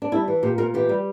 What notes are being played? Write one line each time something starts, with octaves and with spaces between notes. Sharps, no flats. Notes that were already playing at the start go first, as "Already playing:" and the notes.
D4
G3 E4
E3
A#2 G4
A#2 A#4
E3 G4
G3